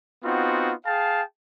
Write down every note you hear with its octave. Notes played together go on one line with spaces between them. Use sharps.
B3 C4 D#4 F4 F#4
G#4 F5 G5 A5